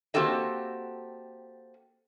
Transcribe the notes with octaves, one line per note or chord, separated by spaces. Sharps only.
A#3 C4 F#4 G4 A4 D#5